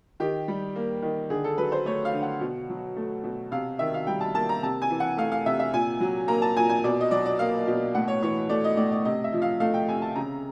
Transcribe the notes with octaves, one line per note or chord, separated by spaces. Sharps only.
D#3 G4
G3
A#3
D#3
D3 G#4
A4
F#3 B4
C5
A3 C#5
F5
D3
F#5
B2
F#3
A3
B2
C3 F5
D#3 E5
F5
G3 G5
A5
A#3 A5
A#5
C3 A5
G#5
E3
F#5
A3 F5
F5
C3 E5
E5
A#2 G#5
F#3
A#3 A#5
A5
A#2 G#5
G#5
B2 D5
D#5
F#3 D5
D5
A#3 F5
B2
A2 F#5
C#5
E3 C#5
A3 D5
D#5
A2 D5
D5
C3 D#5
E5
F3
F5
A3 F5
G5
C3 G#5
A5
C#3 A#5